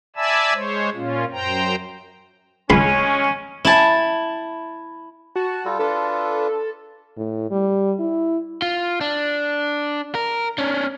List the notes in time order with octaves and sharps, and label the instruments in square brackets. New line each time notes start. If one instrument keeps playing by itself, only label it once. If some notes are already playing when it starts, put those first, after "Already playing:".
[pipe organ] D5 E5 G#5 A5 B5 E6
G#3 C5 C#5
A#2 C#4 F4
F#2 C5 G5 A#5
[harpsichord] C#2 B5 C6 [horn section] G#3 C#4
[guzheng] E4 A5
[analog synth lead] F#4 [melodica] A5
[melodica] G3 F4 A4
[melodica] D4 F4 B4 [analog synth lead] A4
[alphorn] A2
G3
E4
[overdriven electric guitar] F4
D4
A#4
C#4 D4